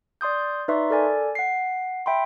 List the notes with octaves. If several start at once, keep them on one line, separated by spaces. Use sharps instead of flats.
D5 C6 D#6 G6
D#4 B4 D5 E5 C6 C#6
A4 A#4 D5 G#5
F#5 C7
E5 G5 B5 C6